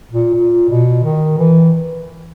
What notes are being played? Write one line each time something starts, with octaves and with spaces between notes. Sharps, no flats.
A#2
A#2
B2
D#3
E3